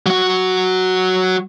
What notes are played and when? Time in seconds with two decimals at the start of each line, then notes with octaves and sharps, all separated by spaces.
0.06 F#3 F#4